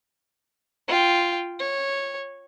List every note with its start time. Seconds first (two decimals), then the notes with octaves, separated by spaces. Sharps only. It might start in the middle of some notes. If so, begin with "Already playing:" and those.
0.88 F4 G5
1.59 C#5